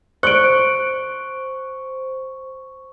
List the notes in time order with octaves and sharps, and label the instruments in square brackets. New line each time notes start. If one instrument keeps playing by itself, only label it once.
[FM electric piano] C5 [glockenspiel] C#6 [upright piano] F#6 [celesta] C#7 D7